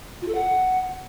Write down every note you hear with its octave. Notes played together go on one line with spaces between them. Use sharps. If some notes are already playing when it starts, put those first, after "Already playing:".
F4
A4
F#5